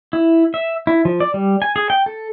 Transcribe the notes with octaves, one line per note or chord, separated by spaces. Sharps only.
E4
E5
E4
F3
D5
G3
G#5
G#4
G5
A4